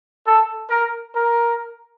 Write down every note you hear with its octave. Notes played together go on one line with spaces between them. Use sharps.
A4
A#4
A#4